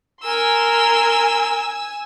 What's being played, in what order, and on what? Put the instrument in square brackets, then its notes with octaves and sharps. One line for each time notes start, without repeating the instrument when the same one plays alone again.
[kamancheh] A#4 C6 [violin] G#5 E6